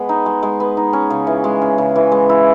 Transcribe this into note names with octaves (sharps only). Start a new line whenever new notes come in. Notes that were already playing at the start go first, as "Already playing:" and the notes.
Already playing: G#3 B3
D#4
G#3
G#3
B3
D#4
C#4
C#3
E3
G#3
C#4
C#3
E3
G#3
E4